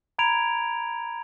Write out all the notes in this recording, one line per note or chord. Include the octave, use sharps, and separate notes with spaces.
A#5 B5 G#6 D7 F7